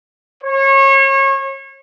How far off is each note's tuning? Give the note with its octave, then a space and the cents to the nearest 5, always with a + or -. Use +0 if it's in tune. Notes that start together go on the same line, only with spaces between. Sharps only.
C#5 -30